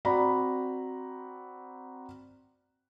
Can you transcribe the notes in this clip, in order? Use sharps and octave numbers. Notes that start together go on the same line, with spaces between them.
C4 F#4 D5 A#5 B5